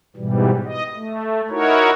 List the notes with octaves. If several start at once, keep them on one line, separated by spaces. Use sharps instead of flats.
G#2 B2 E3 G3
D#5
A3
D#4 E4 F#4 A#4 C#5